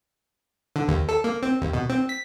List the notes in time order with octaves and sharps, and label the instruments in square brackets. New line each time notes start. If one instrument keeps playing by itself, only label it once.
[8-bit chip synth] D3
D#2
A4
A#3
C4
D#2
B2
C4
B6